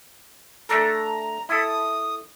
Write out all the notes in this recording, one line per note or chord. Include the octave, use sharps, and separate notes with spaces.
A3 D4 A4 A#5
E4 A4 D#6